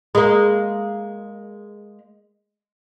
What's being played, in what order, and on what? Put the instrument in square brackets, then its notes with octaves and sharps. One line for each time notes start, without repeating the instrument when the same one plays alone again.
[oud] G#3 A#3